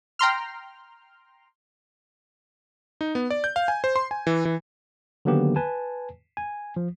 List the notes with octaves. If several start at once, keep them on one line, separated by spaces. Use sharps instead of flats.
G5 A#5 C6 F6
D#4
B3
D5
G6
F5
G#5
C5
C6
G#5
E3
E3
D3 D#3 F#3 A#3 B3 G4
B4 G#5 A5
G#5
F3